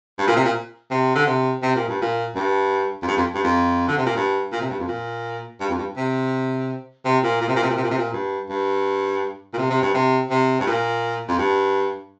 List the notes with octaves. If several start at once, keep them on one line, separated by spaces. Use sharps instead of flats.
G2
A#2
C3
A#2
C3
D3
C3
C3
A#2
G2
A#2
G2
F2
G2
F2
G2
F2
D3
C3
A#2
G2
A#2
C3
G2
F2
A#2
G2
F2
G2
C3
C3
A#2
A#2
C3
A#2
C3
A#2
C3
A#2
C3
A#2
G2
G2
A#2
C3
C3
G2
C3
C3
G2
A#2
F2
G2